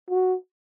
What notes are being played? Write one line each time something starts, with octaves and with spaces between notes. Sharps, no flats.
F#4